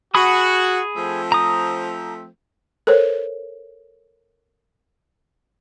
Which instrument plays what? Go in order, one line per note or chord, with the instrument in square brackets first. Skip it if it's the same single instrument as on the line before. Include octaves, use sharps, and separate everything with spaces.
[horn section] F#4 [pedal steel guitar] G#4 B5 D#6
[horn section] F3 A3 C4
[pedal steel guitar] A#5 D#6
[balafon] A4 A#4 C5 C#5